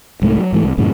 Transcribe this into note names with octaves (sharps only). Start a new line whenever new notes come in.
C2 G#2 A3
F#3
G#2 E3 A3
C2
F#2 A2 C#3 E3